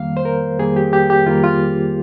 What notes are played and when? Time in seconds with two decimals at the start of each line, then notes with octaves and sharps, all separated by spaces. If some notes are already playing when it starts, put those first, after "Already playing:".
Already playing: F2 D#3 G3 A#3 F5
0.17 C5
0.25 A#4
0.59 F2 D#3 G3 A#3 G#4
0.76 G4
0.93 G4
1.10 G4
1.26 F2 D#3 G3 A#3 F4
1.44 F4